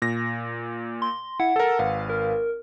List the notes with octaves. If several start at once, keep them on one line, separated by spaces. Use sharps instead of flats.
A#2 A#6
C6
E4 F#5
A4 A#4
G#1 B4 F5
A#4